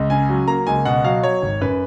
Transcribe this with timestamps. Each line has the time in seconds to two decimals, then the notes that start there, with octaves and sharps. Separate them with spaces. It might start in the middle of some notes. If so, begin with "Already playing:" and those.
Already playing: C#2
0.10 C#3 G#5
0.29 F#3
0.47 A#3 A#5
0.67 C#2 G#5
0.85 B2 F#5
1.04 F#3 F5
1.23 F#3 C#5
1.42 G#1
1.61 F#2 B4